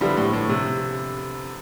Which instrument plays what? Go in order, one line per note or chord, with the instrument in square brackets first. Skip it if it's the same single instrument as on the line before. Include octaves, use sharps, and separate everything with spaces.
[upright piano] D3 F3 B3 E4 [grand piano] G3
[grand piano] A2
A2
C3